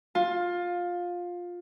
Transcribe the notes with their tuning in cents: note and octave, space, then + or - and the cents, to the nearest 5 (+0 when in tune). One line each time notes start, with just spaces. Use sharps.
F4 +15